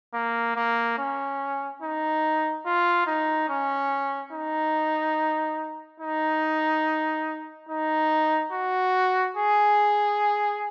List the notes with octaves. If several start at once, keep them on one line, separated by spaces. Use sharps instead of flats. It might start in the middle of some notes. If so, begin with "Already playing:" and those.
A#3
A#3
C#4
D#4
F4
D#4
C#4
D#4
D#4
D#4
F#4
G#4